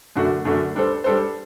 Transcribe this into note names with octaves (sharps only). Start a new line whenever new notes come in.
F#2 D3 A3 D4 F#4
F#2 D3 A3 D4 F#4
G3 D4 A4 C5
G3 D4 A4 C5